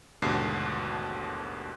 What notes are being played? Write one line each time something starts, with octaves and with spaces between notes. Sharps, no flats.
A1 D#2 G#2 B2 D3 C7